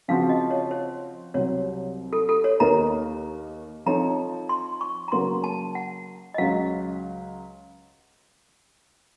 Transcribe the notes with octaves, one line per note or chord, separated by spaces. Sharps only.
C#3 F3 C4 F#4 F5
D#5
C#5
C5
C2 C3 F#3 C4 C#5
A4
A4
C#5
D#2 D#3 A#3 D#4 A#4 A#5
F3 C4 D#4 A4 C#5 A#5
C6
C#6
A#5
C#3 F#3 A#3 C6
A5
F#5
D#5
C#2 C#3 F#3 F5